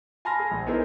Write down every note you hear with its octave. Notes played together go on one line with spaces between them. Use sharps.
G#5 A5 B5 C6 F6 A#6
G#4
A#1
B3 D#4 E4 G#4 A#4 C5